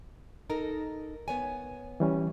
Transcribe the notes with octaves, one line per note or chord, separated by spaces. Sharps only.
D#4 A4 A#4
B3 C#5 G#5
E3 G3 C#4